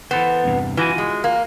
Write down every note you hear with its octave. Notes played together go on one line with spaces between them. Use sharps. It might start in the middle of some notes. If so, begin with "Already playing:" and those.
E3 B3 A4 C5
E2 G2 C3
E3 F4 F#4 G#5
G#3
A#3